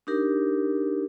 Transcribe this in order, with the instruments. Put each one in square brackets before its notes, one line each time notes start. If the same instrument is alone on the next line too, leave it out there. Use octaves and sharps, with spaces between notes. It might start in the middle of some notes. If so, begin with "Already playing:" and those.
[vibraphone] D4 D#4 G4 A#4